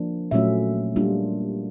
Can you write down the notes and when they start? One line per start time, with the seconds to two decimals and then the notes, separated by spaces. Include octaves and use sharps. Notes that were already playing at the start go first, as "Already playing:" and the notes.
Already playing: F3 A#3 D4
0.31 A#2 F#3 A3 C#4 F4 E5
0.96 G3 A#3 D4 F4